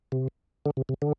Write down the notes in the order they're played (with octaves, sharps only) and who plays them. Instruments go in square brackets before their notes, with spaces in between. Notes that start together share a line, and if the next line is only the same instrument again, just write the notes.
[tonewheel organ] C3
D3
C3
C3
D3